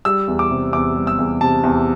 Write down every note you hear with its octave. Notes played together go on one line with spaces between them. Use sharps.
G3 E6
E2
D6
C3
E2 D6
G3
E6
E2
C3 A5
E2